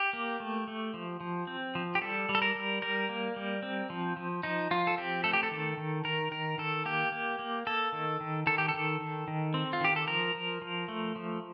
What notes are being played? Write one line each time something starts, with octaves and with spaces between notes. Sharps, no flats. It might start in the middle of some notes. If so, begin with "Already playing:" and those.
Already playing: G4
A#3
A3
A3
F3
F3
C4
F3
G4
G3 A4
G3
A4
A#4
G3
G3 A#4
A#3
G3
C4
F3
F3
F3 D#4
F3 F4
A4
C4 G4
A3 A4
G4
A4
D#3
D#3
D#3 A#4
D#3 A#4
D#3 A4
A#3 G4
A#3
A#3
A#3 A4
D#3
D#3
D#3 A4
G4
A4
D#3
D#3
D#3
C4
F4
D#3 G4
A4
F3 A#4
F3
F3
A3
F3